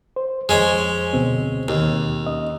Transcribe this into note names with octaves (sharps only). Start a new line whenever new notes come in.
C5
F2 G#3 C#4 C5
D2 B2 C4
D#2
C#4 D#5